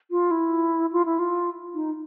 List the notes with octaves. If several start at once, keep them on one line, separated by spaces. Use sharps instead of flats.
F4
E4
F4
E4
F4
D#4